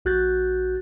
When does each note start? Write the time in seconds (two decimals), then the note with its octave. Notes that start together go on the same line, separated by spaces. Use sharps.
0.05 A#1 F#4 F#6 G6 A6